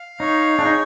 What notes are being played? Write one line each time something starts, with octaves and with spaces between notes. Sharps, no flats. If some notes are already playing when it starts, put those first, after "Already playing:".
Already playing: F5
D#4 C#5
D4 G#4
D#4